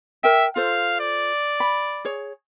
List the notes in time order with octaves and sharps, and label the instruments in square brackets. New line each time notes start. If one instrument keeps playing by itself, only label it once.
[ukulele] A#4 G5 [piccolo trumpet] E5
[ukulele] F4 A4 C5 [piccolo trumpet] F5
[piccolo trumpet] D5
[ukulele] B5
G#4 C#5